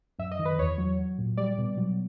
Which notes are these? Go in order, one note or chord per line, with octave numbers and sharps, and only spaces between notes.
F#2 E5
D#5
D#3
B4
E2 C#5
F#3
F#3
A#2
G3 D5
B2
F#3